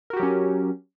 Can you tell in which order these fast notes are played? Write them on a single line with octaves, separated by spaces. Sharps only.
A#4 F#4 G4 F#3 C#4